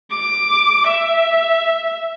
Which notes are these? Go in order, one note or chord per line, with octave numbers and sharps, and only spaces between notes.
D6
E5